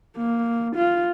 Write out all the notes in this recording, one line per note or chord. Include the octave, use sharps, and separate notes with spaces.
A#3
F4